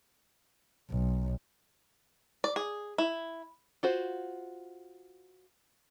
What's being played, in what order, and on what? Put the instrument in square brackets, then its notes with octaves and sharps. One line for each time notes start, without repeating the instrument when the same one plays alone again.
[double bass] B1
[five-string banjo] D5
G#4
E4
F4 F#4 C5